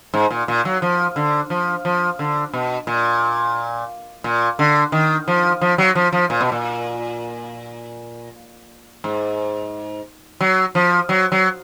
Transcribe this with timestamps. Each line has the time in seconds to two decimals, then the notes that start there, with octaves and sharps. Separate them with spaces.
0.14 G#2
0.31 A#2
0.48 A#2
0.65 F#3
0.82 F3
1.16 D3
1.50 F3
1.85 F3
2.19 D3
2.54 B2
2.87 A#2
4.24 A#2
4.59 D3
4.92 D#3
5.28 F3
5.61 F3
5.78 F#3
5.95 F3
6.12 F3
6.30 A#2
6.41 B2
6.52 A#2
9.04 G#2
10.41 F#3
10.75 F3
11.09 F#3
11.32 F#3